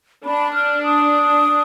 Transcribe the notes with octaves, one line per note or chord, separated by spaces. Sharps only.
D4 B5
F6
D#6